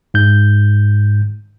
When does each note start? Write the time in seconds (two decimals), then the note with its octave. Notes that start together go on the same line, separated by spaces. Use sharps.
0.14 G#2 G6